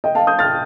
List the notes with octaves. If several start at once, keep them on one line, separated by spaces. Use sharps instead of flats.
D#5 G5
F5 A5
D#6 G6
F6 A6